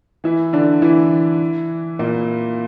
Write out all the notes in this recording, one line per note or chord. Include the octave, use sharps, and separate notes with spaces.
E3 E4
D3 D4
E3 E4
A#2 A#3